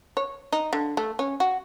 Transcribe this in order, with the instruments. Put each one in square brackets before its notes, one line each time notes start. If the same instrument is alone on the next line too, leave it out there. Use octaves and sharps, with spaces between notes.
[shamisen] C#5
D#4
D3
A3
C#4
F#4